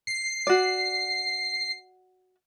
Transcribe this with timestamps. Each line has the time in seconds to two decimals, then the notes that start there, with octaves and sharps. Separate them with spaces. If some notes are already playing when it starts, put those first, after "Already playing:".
0.07 C7
0.47 F#4 D5